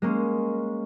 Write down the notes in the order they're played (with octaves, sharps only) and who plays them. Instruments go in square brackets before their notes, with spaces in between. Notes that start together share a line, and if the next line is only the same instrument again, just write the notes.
[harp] G#3 A#3 C#4